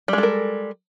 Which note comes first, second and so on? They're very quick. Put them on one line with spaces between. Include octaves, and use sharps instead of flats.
G3 G#3 A4 A#4